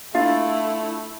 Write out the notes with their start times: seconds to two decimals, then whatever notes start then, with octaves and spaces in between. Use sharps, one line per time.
0.15 A3 D4 E4 F4 F5